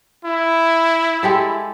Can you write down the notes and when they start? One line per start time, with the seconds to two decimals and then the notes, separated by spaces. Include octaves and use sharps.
0.25 E4
1.23 G#3 G4 A4